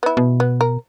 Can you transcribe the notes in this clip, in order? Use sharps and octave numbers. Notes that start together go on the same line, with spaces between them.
B3 E4
B2
B3
A#4